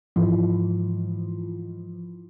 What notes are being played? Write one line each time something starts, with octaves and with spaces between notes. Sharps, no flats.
G#2 E3 F3